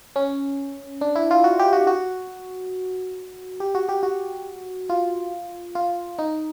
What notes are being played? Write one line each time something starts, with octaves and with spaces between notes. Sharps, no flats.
C#4
D4
E4
F4
F#4
G4
F#4
F#4
G4
F#4
G4
F#4
F4
F4
D#4